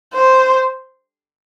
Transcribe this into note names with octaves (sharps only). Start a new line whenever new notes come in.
C5